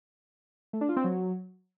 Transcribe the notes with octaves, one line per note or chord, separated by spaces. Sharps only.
A3
D4
F4
C4
F#3